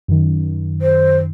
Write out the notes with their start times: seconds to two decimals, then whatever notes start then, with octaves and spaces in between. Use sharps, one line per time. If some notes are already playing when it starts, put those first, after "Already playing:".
0.08 F#2 D#3
0.82 C5